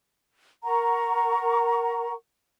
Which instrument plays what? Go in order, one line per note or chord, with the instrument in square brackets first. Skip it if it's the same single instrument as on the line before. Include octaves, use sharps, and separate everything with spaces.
[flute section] A#4 F#5 A#5 C#6